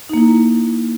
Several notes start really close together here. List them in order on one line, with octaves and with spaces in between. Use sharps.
D#4 A#3 E4